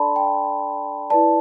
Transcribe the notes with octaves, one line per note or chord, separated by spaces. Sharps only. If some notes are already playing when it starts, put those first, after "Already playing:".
Already playing: D4 A4 D5 A5 B5 C6
G5
E4 B4 D5 A5